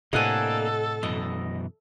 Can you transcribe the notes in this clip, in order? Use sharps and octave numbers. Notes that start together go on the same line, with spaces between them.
A2 C3 A#3 D4 A4 D#5 F#5 G#5
F#2 B2 E3 D#5